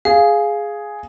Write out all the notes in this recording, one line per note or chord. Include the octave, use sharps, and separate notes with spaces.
G#4 F5